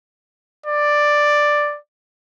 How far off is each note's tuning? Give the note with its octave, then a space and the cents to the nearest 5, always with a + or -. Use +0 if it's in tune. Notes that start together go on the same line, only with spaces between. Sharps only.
D5 +5